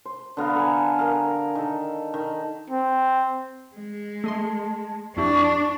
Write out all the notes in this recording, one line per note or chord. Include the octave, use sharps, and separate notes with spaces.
C5
D3 B3 F5 A#5
A4 G#5
A#4 F5
D#3 A4
D#3
C4
G#3
A3 D#5 A5 C6
F2 D4 E4 G4 C#6